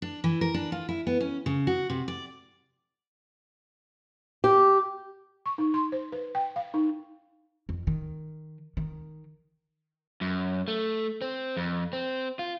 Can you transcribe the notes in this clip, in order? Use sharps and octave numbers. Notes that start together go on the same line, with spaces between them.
D4
E3
A#4
D4
F4
E4
B3
C#4
C#3
F#4
C3
D5
G4
C#6
D#4
C6
C5
B4
G5
F5
D#4
F2
D#3
D#3
F#2
A3
C4
F2
C4
F4